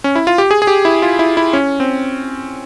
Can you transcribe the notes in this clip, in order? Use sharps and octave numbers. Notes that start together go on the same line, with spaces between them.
C#4
E4
F4
G4
G#4
G#4
G4
E4
F4
E4
E4
C#4
C4